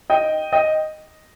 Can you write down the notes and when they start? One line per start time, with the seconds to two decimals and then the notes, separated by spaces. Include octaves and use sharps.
0.10 D#5 G5
0.53 D#5 G5